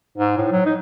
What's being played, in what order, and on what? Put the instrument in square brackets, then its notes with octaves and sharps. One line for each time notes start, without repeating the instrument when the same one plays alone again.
[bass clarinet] G#2
A2
F#3
D#4